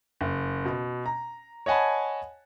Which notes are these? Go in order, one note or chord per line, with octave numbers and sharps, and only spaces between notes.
F#1
B2
A#5
C#5 D#5 F#5 G#5 A5 B5